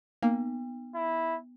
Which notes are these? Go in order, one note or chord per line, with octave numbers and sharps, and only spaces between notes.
A#3 B3
E4